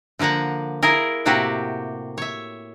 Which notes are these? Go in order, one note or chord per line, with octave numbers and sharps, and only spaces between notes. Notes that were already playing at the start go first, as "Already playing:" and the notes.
D3 F3 A#3 F#5 A#5
A#3 E4 G#4 A#4
A2 C3 A#3 F#4 G4 F#5
C#5 E5